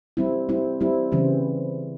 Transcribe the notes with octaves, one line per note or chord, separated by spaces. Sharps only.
G3 C4 E4
G3 C4 E4
G3 C4 E4
C#3 E3 G3 C4